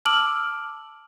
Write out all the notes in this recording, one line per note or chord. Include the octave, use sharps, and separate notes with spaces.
A5 D6 E6 F6 D7 F#7